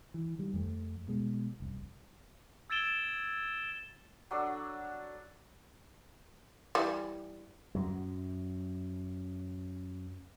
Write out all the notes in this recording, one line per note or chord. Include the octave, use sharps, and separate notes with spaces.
E3
D#3 G3
F2 A3
B2 G#3
F1 C2
E6 G#6 A6 D7 E7 G7
F#3 D4 A4
E3 G3
F#2 F#3